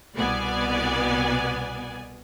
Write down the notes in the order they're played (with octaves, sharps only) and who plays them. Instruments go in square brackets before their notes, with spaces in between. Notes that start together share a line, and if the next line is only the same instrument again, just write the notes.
[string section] C2 B2 B3 D5 G#5